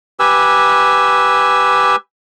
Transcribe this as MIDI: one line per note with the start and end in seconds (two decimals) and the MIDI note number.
0.20 1.96 67
0.20 1.96 71
0.20 1.96 80
0.20 1.96 88